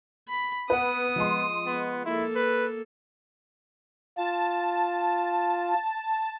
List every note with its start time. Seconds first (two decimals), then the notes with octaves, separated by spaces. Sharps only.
0.28 B5
0.70 B3 B4 F#5 D#6
1.16 F3 G#3 C6
1.66 B3
2.05 A#3 E4 A4
2.35 B4
4.17 F4 A5